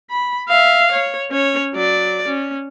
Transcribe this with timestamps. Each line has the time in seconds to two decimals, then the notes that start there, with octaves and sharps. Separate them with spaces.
0.10 B5
0.48 E5 F5
0.92 C#5
1.30 C#4 C#5
1.74 F#3 D5
2.28 C#4